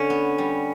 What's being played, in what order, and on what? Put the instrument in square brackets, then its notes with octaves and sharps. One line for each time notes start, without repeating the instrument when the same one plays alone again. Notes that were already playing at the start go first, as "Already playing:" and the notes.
Already playing: [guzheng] D3 [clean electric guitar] C#4
[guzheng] B3
G3